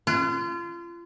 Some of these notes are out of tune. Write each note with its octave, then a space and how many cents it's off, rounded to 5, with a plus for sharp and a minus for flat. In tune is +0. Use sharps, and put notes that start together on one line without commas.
F4 -30